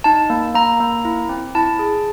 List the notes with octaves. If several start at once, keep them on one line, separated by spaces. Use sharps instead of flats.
D#4 A5
A#3
A#3 A#5
A#3
E4
C4
E4 A5
G#4